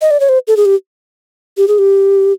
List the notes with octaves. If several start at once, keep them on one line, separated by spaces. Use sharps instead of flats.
D#5
D5
C#5
C5
A4
G#4
G4
G4
G#4
G4